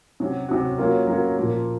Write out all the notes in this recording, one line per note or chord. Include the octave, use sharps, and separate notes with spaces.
C3 F#3 C#4 F#4
C3 F#3 C#4 F#4
F#3 A#3 C#4 F4 A#4
F#3 A#3 C#4 F4 A#4
A#2 F3 A#3 F4